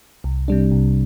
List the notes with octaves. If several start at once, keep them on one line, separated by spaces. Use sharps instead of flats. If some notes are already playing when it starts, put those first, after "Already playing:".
C2
C3 G3 D4
C2